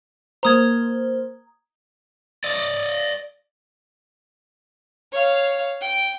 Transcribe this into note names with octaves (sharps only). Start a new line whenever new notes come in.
A#3 C5 A#5 D#6 G#6
D5 D#5
C#5 F5
G5